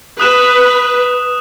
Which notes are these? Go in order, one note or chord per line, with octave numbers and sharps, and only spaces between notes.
B4 D#6 F#6 E7